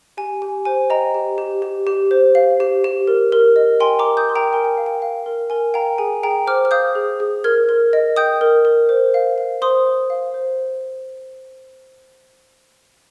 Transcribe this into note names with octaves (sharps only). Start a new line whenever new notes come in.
G4 G#5
G4 G#5
C5 G#5
D#5 G5 A#5
G4
G4
G4
G4
C5
F5
G4
G4
A#4
A#4
D#5
G5 G#5 C6
A#5 D6
A#4
D#6 G6
A#4 C6
G5 A#5
A#4 G#5
G5
F5
G5
F5
A#4
A#4 G#5
F5 G5 A#5
G#4 G#5
G#4 G5 A#5
C5 D6 F6
F6
F5 D#6 G6
G#4
G#4
A#4 F6 G#6
A#4
D#5
G5 D#6 G6
A#4
A#4
C5
F5
F5
C5 C6 D#6
C5
F5
C5